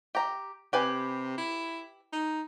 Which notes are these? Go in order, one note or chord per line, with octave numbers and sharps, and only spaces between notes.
G4 A#5
C3 G4 B4 G#5
E4
D#4